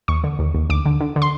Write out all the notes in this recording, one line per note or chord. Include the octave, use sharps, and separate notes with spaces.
D#2 C#6
D3
D#2
D#2
D2 D6
D3
D3
D3
C6